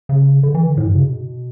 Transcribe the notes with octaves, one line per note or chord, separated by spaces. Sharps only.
C#3
D3
E3
D3
A2
G2
C#3
B2